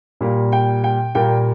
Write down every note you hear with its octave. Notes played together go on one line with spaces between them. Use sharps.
A#2 G3 A#3
G5
G5
A#2 G3 A#3 G5